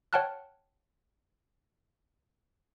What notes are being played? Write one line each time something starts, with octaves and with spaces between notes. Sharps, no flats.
C#5 F#5 G5 A5 F6 F#6